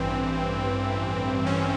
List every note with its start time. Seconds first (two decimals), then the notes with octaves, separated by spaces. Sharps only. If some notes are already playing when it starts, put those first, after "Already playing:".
Already playing: A1 G2 E3 C4
1.46 C#4